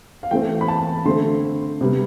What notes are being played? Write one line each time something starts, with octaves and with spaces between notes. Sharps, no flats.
F5
E3 A3 C4 G5
B5
A5
D3 A3 C4 C6
C3 G3 B3